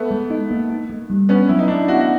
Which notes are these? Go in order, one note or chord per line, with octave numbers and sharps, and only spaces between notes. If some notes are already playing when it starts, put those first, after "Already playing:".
Already playing: A3 B3
G#3
D#4
A#3
D#4
A3
G3
B3 C#4 D4
F#3 E4
D#4
A3 D4 E4
B3 E4 F#4
F#4